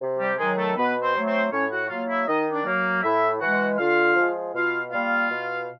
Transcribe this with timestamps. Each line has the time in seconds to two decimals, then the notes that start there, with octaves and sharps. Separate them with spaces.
0.01 C3
0.19 G3 G4
0.38 D#3 F#3 G#3 G#4
0.57 A3 A4
0.77 B2 B3 B4
1.02 C4 C5
1.15 F#3 A3
1.26 C4 C5
1.52 A2 C#4 C#5
1.71 F#4 F#5
1.89 F#3 A#3 F4 F5
2.08 E4 E5
2.27 D#3 D#4 D#5
2.52 D4 D5
2.65 F#3 A#3
3.02 A2 E4 E5
3.40 E3 G#3 F#4 F#5
3.78 D3 F4 F5
4.16 F3 G#3
4.53 B2 F4 F5
4.91 G3 A#3 F4 F5
5.30 B2